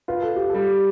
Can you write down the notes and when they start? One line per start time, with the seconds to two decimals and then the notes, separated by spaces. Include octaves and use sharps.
0.08 F4 B4
0.22 A4
0.36 G4
0.50 G3 A4